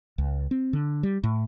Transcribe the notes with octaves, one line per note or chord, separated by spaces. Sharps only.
C#2
C4
D3
G3
A2